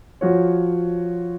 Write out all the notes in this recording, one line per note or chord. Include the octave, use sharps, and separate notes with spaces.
F3 F#4 C#5